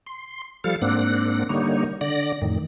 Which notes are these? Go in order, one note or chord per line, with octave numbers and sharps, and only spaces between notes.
C6
F3 G3 A4 F5
G#2 A#3 C4 D4 F#5
D3 G3 A#3 D#4 C#5
D3 D5 A#6
F2 A2 D#3